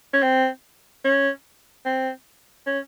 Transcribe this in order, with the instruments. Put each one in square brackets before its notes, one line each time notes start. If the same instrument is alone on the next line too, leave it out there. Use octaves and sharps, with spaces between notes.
[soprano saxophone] C#4
C4
C#4
C4
C#4